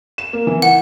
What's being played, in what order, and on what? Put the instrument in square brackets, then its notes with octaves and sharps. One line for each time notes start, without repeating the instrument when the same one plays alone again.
[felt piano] E7
A#3
E3
[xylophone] F#5